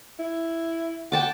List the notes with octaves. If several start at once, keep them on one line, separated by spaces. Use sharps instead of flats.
E4
F#5 G5 A5 D6